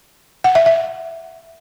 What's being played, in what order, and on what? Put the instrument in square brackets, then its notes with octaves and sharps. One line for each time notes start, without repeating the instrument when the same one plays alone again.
[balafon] F#5
E5
E5